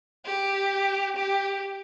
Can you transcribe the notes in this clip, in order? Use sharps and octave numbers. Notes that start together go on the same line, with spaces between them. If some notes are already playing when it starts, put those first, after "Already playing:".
G4
G4